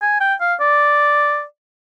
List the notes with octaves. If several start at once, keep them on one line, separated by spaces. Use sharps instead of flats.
G#5
G5
F5
D5